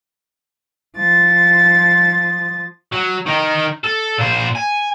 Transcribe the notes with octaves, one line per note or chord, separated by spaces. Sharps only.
F3 A6
F#3
D#3 D#4
A4
A#2 C5
G#5